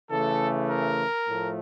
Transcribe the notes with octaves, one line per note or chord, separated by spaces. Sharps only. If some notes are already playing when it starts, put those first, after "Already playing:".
C#3 E3 A3 A4
A#4
A2 F3 A3